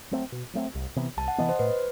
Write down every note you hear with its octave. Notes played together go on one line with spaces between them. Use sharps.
F#3 A3 C4
B2
F#3 A3 C4
C2
C3 E3 B3
C2 A5
F#5
C3 E3 B3 D#5
C5
A2 B4